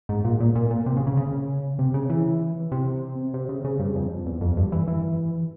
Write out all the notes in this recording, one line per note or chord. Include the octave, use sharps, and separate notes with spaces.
G#2
A#2
A#2
A#2
A#2
C3
C#3
C#3
C#3
C3
C#3
E3
C3
C3
C#3
C#3
G2
F2
E2
F2
G2
E3
E3